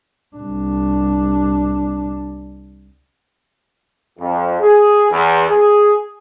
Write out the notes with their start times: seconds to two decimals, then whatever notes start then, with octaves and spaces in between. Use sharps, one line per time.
0.36 C2 D4
4.19 F2
4.60 G#4
5.10 E2
5.48 G#4